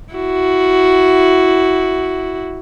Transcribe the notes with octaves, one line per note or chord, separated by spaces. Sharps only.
E4 F#4